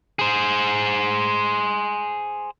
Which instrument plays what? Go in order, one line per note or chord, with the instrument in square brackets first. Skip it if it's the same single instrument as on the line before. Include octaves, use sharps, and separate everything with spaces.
[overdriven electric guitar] G#4 C5